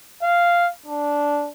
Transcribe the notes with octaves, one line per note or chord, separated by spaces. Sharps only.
F5
D4